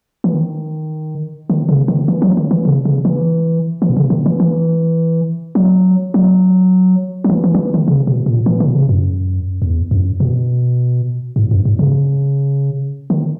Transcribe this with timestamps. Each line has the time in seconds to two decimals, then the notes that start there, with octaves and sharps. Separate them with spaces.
0.24 E3
0.33 D#3
1.50 D#3
1.69 C#3
1.88 D#3
2.08 E3
2.22 F#3
2.37 D#3
2.51 E3
2.65 C#3
2.85 C#3
3.05 E3
3.82 E3
3.89 B2
3.97 C#3
4.10 D#3
4.26 E3
4.40 E3
5.55 F#3
6.14 F#3
7.24 F#3
7.30 E3
7.44 E3
7.55 F#3
7.59 E3
7.74 D#3
7.88 C#3
8.07 B2
8.26 A#2
8.46 E3
8.60 D#3
8.67 B2
8.75 C#3
8.89 F#2
9.62 E2
9.91 F#2
10.20 B2
11.36 G#2
11.51 F#2
11.65 G#2
11.79 C#3
13.10 D#3